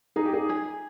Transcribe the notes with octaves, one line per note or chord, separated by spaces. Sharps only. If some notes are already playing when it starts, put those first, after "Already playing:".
D#4 G#4
G4
G#4
G#4